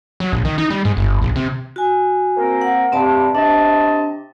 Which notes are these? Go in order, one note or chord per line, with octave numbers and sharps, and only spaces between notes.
F#3
A#1
D#3
D#4
G3
G#2
G1
A#1
C3
F#4 G#5
A#3 C4 A#4
F#5
G2 C3 C4 D5 A5
C3 D4 D#5 A5